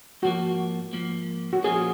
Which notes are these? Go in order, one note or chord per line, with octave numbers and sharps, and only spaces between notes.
G#2 F3 A#3 F#4
G#2 F3 A#3
F#4
A#2 F3 A#3 C#4 G#4